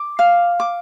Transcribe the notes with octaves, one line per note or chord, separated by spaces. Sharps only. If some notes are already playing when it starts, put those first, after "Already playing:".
Already playing: D6
F5
D6